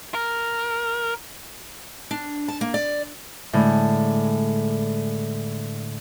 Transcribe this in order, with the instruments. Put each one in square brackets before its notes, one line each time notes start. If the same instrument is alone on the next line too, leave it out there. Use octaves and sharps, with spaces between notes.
[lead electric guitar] A#4
[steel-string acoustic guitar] D4
A5
A#3
D5
[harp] A2 D3 G#3